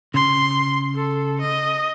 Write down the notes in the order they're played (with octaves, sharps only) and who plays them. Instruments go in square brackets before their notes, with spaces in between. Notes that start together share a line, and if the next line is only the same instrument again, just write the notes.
[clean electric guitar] C#3 [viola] C6
[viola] A4
D#5